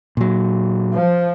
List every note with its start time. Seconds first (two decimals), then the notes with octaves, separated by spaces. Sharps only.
0.17 A#2 F#3
0.94 F3